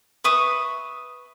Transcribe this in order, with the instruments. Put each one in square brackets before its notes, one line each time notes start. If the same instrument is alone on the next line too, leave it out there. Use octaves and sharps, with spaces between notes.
[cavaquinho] B4 E5 C#6 D#6